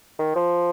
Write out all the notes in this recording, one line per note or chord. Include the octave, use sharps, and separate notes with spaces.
D#3
F3